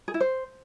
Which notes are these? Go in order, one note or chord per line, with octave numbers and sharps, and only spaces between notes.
G#4
E4
C5